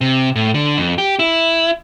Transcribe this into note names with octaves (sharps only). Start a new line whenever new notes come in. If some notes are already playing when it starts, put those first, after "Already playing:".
C3
A2
D3
F2
G4
E4